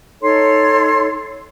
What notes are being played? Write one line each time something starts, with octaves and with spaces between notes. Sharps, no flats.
D#4 A4 C#5 C6